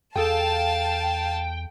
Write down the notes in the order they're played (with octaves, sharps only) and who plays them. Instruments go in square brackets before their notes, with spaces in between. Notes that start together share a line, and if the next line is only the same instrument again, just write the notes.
[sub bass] E2 [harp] G#4 A4 [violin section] F5 A5 [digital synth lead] G5